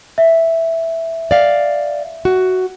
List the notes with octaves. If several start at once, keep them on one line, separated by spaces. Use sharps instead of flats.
E5
D5 F5
F#4